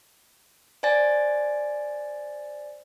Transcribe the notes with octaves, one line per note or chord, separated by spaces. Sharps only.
C5 D5 G#5 A6